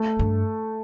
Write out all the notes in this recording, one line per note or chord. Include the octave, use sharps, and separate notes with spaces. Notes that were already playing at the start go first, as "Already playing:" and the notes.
Already playing: A3 A4
G2